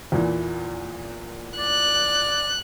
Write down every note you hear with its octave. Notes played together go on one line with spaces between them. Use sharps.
E2 A#2 E3
D5 F#6